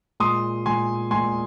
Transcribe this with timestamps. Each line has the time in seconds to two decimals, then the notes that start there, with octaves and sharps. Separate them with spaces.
0.20 A#2 G#3 C6 D#6
0.66 A#2 G#3 G#5 C6
1.11 A#2 G#3 G#5 C6